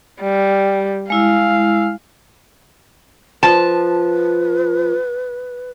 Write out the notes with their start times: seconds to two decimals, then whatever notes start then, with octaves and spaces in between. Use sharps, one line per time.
0.21 G3
1.10 G#3 E4 F5 E6
3.43 F3 B4 A5